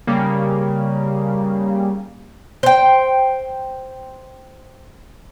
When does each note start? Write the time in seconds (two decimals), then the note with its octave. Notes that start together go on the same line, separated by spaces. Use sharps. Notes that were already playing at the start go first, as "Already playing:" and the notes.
0.07 C#3 G3 A#3
2.63 C5 G5